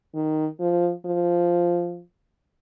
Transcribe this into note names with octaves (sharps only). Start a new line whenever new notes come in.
D#3
F3
F3